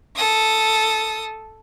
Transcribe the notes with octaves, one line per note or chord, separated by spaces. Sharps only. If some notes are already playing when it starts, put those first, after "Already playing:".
A4 D#6